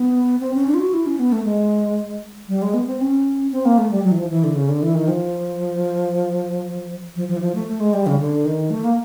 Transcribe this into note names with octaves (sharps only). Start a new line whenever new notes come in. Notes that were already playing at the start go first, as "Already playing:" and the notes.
Already playing: B3
C4
C#4
D4
F4
F#4
E4
C#4
B3
A3
G#3
G3
G#3
B3
C4
C#4
C4
A#3
A3
G3
F#3
E3
F3
E3
D3
C#3
D3
E3
D#3
F3
F3
F3
E3
F3
A3
A3
G#3
G3
C#3
D3
D#3
A3
A#3